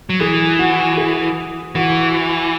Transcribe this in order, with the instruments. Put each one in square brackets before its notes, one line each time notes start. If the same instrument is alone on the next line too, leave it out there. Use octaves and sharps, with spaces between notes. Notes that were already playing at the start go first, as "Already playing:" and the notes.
[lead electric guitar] F#3
[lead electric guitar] E3 [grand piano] G#4
[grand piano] F#4
G#4
[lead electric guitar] E3 [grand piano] F#4